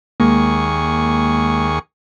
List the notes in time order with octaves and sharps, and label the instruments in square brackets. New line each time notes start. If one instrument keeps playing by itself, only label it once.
[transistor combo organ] D#2 G#4 C#6 [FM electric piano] G#3 A#3